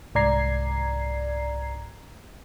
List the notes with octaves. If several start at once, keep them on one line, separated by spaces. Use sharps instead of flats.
C2 G#2 D5 A#5 G#6 C7